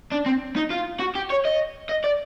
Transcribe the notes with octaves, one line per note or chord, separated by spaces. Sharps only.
D4
C4
D#4
F4
F#4
G4
C#5
D#5
D#5
D5